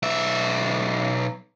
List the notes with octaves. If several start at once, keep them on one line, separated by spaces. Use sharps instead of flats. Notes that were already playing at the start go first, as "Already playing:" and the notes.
B1 E5